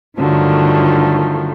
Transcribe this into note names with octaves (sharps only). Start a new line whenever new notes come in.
G2 D3 D#3 F3 F#3 A3